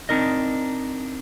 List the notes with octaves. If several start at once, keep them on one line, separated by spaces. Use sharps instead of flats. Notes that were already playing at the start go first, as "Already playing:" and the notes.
C4 D4 D#4 A#4 D#5